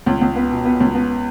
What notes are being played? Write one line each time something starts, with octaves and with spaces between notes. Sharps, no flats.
C#2
C#2
B3
B2
B3
C#2
B3